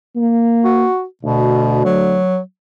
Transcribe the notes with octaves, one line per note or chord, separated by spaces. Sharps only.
A#3
F#4
D2 B2
F#3